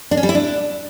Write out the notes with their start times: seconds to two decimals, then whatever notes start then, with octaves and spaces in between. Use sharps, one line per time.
0.11 D4
0.17 C#4
0.23 G3
0.29 E4
0.35 D4